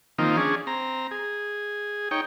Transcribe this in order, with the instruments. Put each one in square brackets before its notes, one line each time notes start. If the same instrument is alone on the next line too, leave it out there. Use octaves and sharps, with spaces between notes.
[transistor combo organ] D#3 F3 A#3 C4 D#4
C#4 D4 G#4
C4 A#5
G#4
D#4 C#5 G5